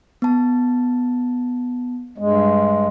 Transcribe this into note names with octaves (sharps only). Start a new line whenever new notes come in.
B3 A5
G2 G#3